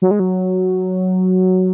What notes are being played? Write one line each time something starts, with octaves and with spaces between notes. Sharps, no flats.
F#3
G#3
F#3